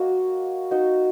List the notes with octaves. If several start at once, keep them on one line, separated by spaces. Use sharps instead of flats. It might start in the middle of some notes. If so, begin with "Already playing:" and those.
Already playing: A#3 F#4 D#5
D#4 F#4 D#5